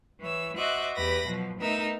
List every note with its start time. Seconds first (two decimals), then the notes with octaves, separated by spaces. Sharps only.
0.21 E3 C#5 E6
0.56 F#4 C5 D#5 E5 D6 F#6
0.95 E2 G4 B4 B5 A#6
1.26 B2 F3 F#3
1.59 A3 B3 D#4 A#4 E5